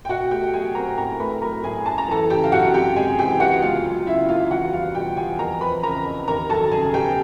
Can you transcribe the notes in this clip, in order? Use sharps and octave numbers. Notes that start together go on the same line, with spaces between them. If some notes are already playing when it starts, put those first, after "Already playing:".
G5
B2 F#4 F#5
A3 G4 G5
F#3 G#4 G#5
C4 A#4 A#5
A2 A#4 A#5
A3 B4 B5
F#3 A#4 A#5
A2 G#4 G#5
F#2 A5
A#5
E3 A4 A5
C#3 G4 G5
F5
F#2 F#4 F#5
C3 G4 G5
G#3 G#4 G#5
E3 G4 G5
B3 F#4 F#5
C#2 F4 F5
F#3
C#3 E4 E5
A#3 F4 F5
E2 F#4 F#5
G3 F4 F5
B2 G4 G5
E2 G#4 G#5
F2 A#4 A#5
F3 B4 B5
C#3 A#4 A#5
F2
D#2 A#4 A#5
F#3 A4 A5
C#3 G#4 G#5
B3 G4 G5